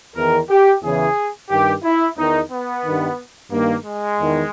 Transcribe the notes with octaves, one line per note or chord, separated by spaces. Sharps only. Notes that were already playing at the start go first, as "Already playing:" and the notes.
E2 D#3 A#4
G4
E2 C#3 E3 G#4
G2 D#3 G4
E4
E2 D#3 D#4
B3
G2 D#3
G2 D#3 A#3
G#3
E2 D#3